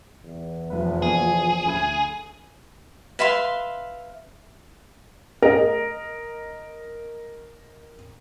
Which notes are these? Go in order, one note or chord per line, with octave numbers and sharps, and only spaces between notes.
E2
F1 F3 B4
B2 D3 A#3 G#4
D2 B5 G#6
B4 E5 F5 C6
A#4 D#5